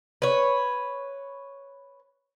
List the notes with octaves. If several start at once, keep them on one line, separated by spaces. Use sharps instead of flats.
B4 C#5